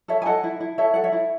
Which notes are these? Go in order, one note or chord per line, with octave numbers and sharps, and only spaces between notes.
A4 C#5 E5
G#5
A4 D#5 F#5
E4
E4
A4 C#5 E5
A4 F#5
C#5 E5
E4